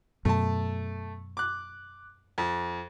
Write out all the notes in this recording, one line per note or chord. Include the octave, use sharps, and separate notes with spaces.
F#2 B2 A3 A5
D6 F#6
F2